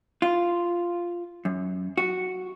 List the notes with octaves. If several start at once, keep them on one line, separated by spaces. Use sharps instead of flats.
F4
F#2
F#4